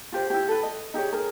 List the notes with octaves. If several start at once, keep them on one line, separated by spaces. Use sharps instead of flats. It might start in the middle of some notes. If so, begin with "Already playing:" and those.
F4 G4 C5
E4 G4
A4 B4
D#5
D#4 G4 G#4 C#5
G#4 A#4